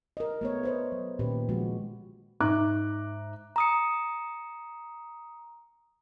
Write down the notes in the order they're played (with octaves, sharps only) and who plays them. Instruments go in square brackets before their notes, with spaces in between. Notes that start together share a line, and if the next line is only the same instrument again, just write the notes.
[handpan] A#4 D#5
A3 B3 C#5
B4 C5 D#5
F#3
A#2 D#3 C#4 G4 B4
D3 F3 G#3 F#4
[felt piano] G#2 D#4 E5 A#5 D6 F#6
[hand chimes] A#5 D#6 C#7